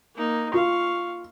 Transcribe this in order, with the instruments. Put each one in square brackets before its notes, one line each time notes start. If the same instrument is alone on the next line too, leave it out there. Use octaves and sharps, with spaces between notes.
[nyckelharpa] A#3 D#4
[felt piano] F4 [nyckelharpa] F5 C#6